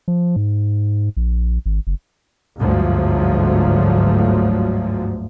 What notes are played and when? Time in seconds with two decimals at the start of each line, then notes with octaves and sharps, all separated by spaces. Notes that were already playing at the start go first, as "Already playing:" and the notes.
0.08 F3
0.36 G#2
1.17 A#1
1.66 G#1
1.87 F#1
2.58 G1 D2 G#2 F3 F#3